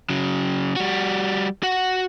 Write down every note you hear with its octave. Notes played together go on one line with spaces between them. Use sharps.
C#3 F#3
G3 F#4
F#4 F#5